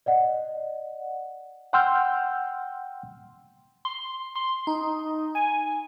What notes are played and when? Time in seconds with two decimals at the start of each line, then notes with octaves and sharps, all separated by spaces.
0.06 D5 D#5 F#5
1.73 F#5 G5 C6 E6 F6 G6
3.85 C6
4.36 C6
4.67 D#4
5.35 G#5